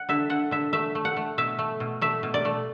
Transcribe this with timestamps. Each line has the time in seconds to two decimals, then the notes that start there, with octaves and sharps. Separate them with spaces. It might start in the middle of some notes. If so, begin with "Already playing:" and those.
Already playing: F#5
0.09 D3 E5
0.30 D3 F#5
0.51 D3 E5
0.73 A3 E5
0.95 A3
1.05 F#5
1.17 A3
1.38 B2 E5
1.59 A3
1.80 B2
2.01 A3 E5
2.23 B2
2.34 D5
2.45 A3